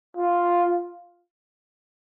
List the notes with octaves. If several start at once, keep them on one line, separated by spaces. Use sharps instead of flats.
F4